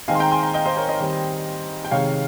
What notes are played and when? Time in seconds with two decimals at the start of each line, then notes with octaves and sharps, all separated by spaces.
0.08 D#3 G#3 C4 D#4 F5 G#5
0.15 C6
0.20 G5 A#5
0.31 G#5 C6
0.43 G5 A#5
0.54 D#5 G5
0.66 C5 D#5
0.76 A#4 C#5
0.89 C5 D#5
1.00 D#3 G3 C4
1.85 G5
1.91 C3 D#3 G#3 C#5 F5